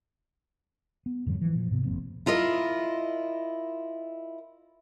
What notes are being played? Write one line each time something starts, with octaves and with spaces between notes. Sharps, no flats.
B3
F2 G#2 D3 F#3
E3 F3
A#2 F3
G#2 C3 B3
G1 F2 A#3 C4
E4 F4 A#4 D#5